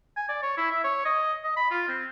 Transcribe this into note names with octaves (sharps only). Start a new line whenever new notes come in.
G#5
D5
C#5
E4
E5
C#5
D#5
D#5
B5
F4
C4